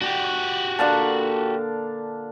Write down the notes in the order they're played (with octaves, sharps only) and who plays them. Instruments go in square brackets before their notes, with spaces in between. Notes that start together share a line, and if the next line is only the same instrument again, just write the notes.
[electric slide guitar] F#4 G4 [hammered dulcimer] D5
[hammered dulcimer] A#2 D3 [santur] D4 F5 A5